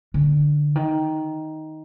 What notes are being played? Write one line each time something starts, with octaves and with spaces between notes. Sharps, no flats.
D3
D#3